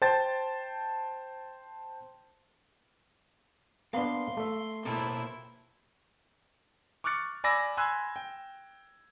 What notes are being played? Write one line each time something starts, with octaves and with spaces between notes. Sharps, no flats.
C5 G5 A5 A6
A#3 B3 D4 F5 C6
A3 E5
B2 A#3 E4 A4 C5
C#6 D6 F6 F#6 A6 C#7
D5 G#5 B5 D6 E6 A#6
G#5 B5 C6 E6 F#6 G#6
G5